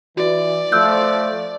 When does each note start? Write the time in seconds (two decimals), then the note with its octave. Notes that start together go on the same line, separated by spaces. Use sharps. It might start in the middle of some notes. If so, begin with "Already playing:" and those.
0.17 E3 F#4 D5
0.72 F3 A3 E6 F#6 G6